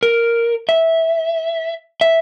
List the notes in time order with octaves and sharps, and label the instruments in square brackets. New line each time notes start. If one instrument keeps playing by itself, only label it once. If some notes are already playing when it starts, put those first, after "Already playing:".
[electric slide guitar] A#4
E5
E5